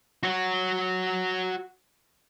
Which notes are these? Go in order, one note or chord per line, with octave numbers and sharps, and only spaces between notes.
F#4 C#5